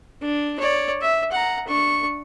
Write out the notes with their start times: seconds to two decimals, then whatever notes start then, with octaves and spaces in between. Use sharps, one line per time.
0.21 D4
0.59 C#5 D5
1.01 E5
1.32 F#5 A#5
1.68 D4 C#6